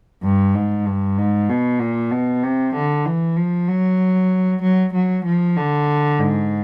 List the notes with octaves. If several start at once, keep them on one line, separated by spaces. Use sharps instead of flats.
G2
G#2
G2
G#2
B2
A#2
B2
C3
D3
E3
F3
F#3
F#3
F#3
F3
D3
G#2